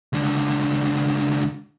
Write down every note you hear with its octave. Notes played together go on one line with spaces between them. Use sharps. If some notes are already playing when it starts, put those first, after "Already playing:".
C#2 D3